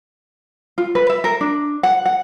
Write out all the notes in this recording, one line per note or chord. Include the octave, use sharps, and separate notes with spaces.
F4
B4
E5
A#4
D4
F#5
F#5